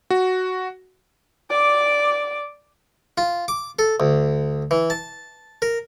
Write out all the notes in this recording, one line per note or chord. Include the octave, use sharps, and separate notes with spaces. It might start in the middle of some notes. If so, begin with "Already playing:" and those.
F#4
D5 D6
F4
D6
A4
D2
E3
A5
A#4